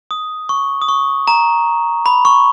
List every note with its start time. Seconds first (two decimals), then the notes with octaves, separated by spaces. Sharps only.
0.11 D#6
0.49 C#6
0.82 D#6
0.88 C#6
1.27 A#5
2.06 B5
2.25 C#6